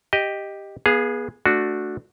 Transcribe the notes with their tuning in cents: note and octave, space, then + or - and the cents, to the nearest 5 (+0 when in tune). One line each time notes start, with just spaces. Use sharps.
G4 +5 D#5 +0
B3 -25 G#4 +0 F5 +5
A3 +0 D4 +0 F#4 -10